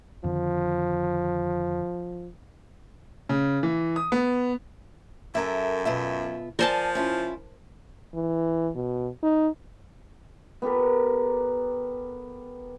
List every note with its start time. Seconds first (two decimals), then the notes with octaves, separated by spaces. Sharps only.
0.24 F2 D3 D#3 F3
3.29 C#3
3.63 E3
3.96 D#6
4.12 B3
5.35 F#2 A4 A#4 E5
5.85 B2 F4 E5
6.59 F3 A#4 C5 D5 G#5 A5
6.95 C#4 E4 F4
8.14 E3
8.75 B2
9.23 D#4
10.62 B3 G4 A4 A#4